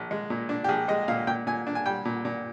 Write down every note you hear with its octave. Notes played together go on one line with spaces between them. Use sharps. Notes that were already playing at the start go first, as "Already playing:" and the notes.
Already playing: A#1
G#3
A#2
D4
G4
A#1 G#4
G#3 D#5
A#2 F5
A#2 G5
A#2 G#5
D4
G#5
G3 G5
A#2
A#2